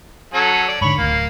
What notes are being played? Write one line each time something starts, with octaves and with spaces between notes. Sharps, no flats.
F#3 C#4 A4
D5
G#2 D3 C#5 B5
D1 A2 A#3